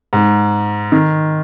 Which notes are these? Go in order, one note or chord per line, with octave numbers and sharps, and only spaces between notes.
G#2
D#3